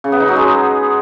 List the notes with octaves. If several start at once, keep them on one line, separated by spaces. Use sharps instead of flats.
C#3
B3
D#4
F#3
G#3